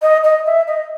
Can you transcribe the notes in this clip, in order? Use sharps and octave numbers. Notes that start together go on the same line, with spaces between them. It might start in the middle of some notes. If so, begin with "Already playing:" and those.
D#5
D#5
E5
D#5